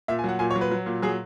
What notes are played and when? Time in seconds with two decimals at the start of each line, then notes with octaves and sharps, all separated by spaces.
0.08 A#2 E5
0.19 G#5
0.24 F#3 F#5
0.39 A#2 G#5
0.51 C#5
0.56 F#3
0.61 B4
0.71 F#3
0.86 A#2
1.02 F#3 G#4